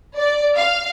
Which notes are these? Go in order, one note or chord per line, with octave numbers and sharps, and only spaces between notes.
D5
F5